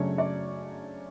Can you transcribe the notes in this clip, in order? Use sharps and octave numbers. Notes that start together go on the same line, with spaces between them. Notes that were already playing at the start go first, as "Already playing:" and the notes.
Already playing: F#2 C#3 F#3 A3 D4 C#5
D5